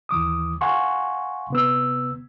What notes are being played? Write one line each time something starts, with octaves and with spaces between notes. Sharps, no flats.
D#2 E3 D6 D#6
F5 F#5 G#5 C6 C#6
C3 B3 E6